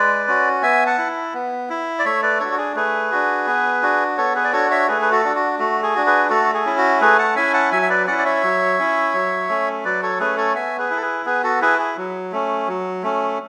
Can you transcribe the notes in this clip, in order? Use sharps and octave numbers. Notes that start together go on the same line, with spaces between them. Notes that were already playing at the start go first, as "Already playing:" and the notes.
Already playing: G#3 B4 D5
C#4 F#4
B3 E5 G#5
F#5 A5
E4
B3
E4
D5
A3 C#5 E5
B4 D5
D4 F#4 A4 C#5
F#4
G#4
A3 G#4 B4
D4 F#4
B3
D4 F#4
B3 A4 C#5
G#4 B4
D5
D4 F#4 A4 C#5
C#5 E5
A3 G#4 B4
B4
F#4 A4
D4 F#4
F#4
A3 F#4
G#4
D4 F#4
G#4 B4
A3 F#4 A4
G#4
C#4 E4
F#4
A3 G#4 B4
F#5 A5
C#4 E4 E5 G#5
F#5 A5
F#3 E5 G#5
E5
B4 D5
C#4 E4 D5 F#5
D5
C#5 E5
F#3
C#4 E4
F#3
A3 C#4
F#3 B4 D5
A4 C#5
A3 C#4 G#4 B4
A4 C#5
B3 E5 G#5
G#4 B4
E4
A4
G#4 B4
B3 G#4 B4
F#4 A4
E4 G#4 B4
G#4
F#3
A3 C#4
F#3
A3 C#4